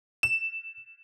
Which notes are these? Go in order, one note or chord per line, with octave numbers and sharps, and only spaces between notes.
E7